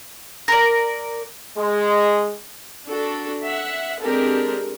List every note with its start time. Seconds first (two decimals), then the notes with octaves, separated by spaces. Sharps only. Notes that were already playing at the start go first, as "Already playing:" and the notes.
0.48 A#4 D5
1.57 G#3
2.89 D4 F#4 A4
3.44 E5 F#5
4.02 G#3 C4 D4 G4 A4 A#4